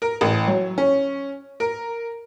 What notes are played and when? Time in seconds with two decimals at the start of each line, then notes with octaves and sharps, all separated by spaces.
0.02 A#4
0.21 A1
0.47 F#3
0.78 C#4
1.60 A#4